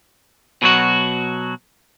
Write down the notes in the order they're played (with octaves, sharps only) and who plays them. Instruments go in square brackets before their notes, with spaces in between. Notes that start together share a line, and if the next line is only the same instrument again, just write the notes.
[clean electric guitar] B2 F#3 F#4